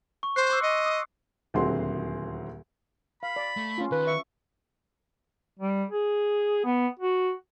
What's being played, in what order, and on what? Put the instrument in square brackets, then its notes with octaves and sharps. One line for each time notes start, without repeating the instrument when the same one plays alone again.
[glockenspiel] C#6
[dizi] C5 [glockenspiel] F#6 C7
[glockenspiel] C6 D6 E6
[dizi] D#5 [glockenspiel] C#7
[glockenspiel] D#6
[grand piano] D#1 D2 F#3 C4 G#4 C6
[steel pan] F5 [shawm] B5
[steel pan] D5
[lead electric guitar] A3
[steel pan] C#4 F4
[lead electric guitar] D#3 [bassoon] B4
[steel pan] E5 [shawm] C#6
[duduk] G3
G#4
B3
F#4